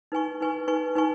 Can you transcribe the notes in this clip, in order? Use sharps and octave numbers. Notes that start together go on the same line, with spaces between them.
D#4 B4 G#5 C#6
D#4 B4 G#5 C#6
D#4 B4 G#5 C#6
D#4 B4 G#5 C#6